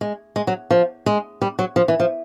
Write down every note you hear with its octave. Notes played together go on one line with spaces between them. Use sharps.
G#3
G#3
F#3
F3
G#3
G3
F#3
F3
E3
F3